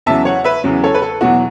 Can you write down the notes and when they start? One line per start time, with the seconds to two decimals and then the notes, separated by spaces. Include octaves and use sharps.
0.06 E2 C#3 F#3 E5 A5
0.25 C#5 F#5
0.44 B4 E5
0.64 E2 C#3 F#3
0.84 A4 C#5
0.94 B4
1.02 A4
1.21 E2 B2 F#3 F#4